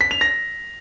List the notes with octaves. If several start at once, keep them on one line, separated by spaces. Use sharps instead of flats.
B6
F7
A#6